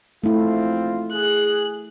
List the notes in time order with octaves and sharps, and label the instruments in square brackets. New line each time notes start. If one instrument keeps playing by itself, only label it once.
[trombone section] A#1 C4 F4 [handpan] A3 E4
[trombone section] G#4 [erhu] F#6